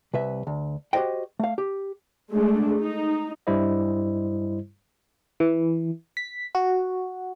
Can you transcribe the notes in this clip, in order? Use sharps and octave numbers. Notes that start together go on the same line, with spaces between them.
C2 B4 E5
D2
F#4 G4 A4 C5 D#5 G5
A3 F5
G4
G#3 A3 D4
D#4
G2 G3 E4 C5 D#5
E3
B6
F#4